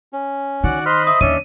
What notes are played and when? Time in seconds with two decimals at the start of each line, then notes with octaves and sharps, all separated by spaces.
0.13 C#4
0.64 D#3 F#4 D5 F#5
0.86 C5 D#5 B5 C6 F6 F#6
1.07 E5 D#6
1.21 D#2 E3 C#4 D4 C#5 D#5 E5 D#7